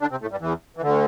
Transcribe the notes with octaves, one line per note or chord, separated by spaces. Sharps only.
D3 D4
C3 C4
A2 A3
G2 G3
E2 E3
E3
D2 D3